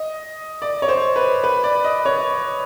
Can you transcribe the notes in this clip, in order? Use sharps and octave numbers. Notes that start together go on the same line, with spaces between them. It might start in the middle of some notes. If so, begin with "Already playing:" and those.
Already playing: D#5
D5
C#5
C5
B4
B4
D5
D#5
C#5